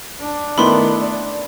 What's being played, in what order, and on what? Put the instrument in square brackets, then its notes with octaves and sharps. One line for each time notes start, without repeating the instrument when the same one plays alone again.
[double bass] D4
[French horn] D#3 [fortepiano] A3 B3 E4 [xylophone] B5 C6
[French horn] D5